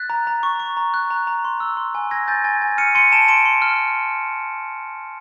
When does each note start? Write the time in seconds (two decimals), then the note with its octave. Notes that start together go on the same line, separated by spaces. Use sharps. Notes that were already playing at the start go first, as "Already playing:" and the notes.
Already playing: F#6 A6 B6
0.10 A#5
0.27 A#5
0.43 C#6
0.59 C#6
0.77 A#5
0.94 F#6
1.10 A#5
1.27 A#5
1.45 C6
1.60 E6
1.77 C6
1.95 G#5
2.11 E6 G#6 A#6
2.28 G#5 G6 A6
2.44 G#5 G#6
2.61 G#5
2.78 F6 C#7 D#7
2.95 C6 C#7 D#7
3.12 A5 D7 E7
3.28 C6 D7 E7
3.45 C6
3.62 F6